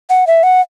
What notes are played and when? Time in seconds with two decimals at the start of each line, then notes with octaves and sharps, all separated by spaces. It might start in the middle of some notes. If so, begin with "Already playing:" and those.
0.10 F#5
0.27 E5
0.43 F#5